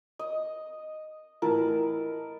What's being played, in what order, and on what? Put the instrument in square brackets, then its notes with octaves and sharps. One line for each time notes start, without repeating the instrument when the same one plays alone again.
[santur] D#5
[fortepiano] A2 E3 [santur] A#4 B4 A5